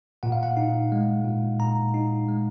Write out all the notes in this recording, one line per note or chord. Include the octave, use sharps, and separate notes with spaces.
A#2 F#5
F5
F#5
D#4
G#3
A#2
A#2 A#5
D#4
G#3